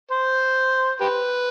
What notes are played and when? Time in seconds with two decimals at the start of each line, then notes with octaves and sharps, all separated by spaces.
0.11 C5
1.01 G4 B4